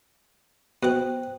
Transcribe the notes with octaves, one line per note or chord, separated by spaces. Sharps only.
B2 C5 F#5 G5 F#6